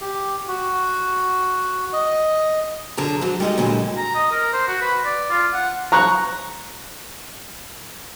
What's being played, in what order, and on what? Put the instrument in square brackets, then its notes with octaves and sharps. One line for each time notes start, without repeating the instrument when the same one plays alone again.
[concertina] G4
F#4
D#5
[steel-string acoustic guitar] F#2 D3 G#4 A5 A#5
G#2 F#3
G3 G#3 D#4 A4 D#5
A#2 D3 F#3 G#3 E4 G4
[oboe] A#5
D#5
A#4
C5
F#4
B4
D5
F4
F#5
[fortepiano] A#5 C#6 F#6